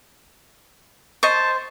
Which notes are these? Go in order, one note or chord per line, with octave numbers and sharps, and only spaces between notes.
C5 D#5 A5 C#6